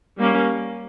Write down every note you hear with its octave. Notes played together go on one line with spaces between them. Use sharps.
G3 A#3 C#4